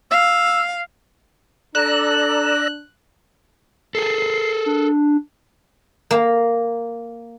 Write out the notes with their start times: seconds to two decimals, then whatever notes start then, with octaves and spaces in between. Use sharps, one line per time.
0.11 F5 E6
1.75 D4 A4 D5 A#5 E6 F#6
3.95 G#4 A4 C7
4.66 D4
6.11 A#3